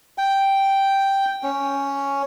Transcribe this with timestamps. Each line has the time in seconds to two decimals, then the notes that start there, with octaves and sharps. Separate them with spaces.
0.18 G5
1.43 C#4